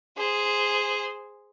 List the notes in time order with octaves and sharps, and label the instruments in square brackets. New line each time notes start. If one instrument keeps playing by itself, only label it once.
[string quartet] G#4 C5